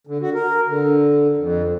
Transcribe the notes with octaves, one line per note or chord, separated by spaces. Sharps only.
D3
F#4
A#4
D3
F2